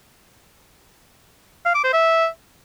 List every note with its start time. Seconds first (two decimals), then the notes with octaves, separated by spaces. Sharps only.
1.65 F5
1.75 D6
1.84 C5
1.93 E5